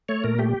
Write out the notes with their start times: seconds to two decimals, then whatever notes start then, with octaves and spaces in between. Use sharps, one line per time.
0.09 A3 C#5
0.24 A#2 A#4
0.39 A3 G4